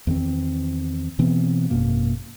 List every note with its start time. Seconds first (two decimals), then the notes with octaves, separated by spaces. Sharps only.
0.07 E2 D#3 C4
1.19 B2 E3 B3 C4
1.70 G#1 F#2 B2 A#3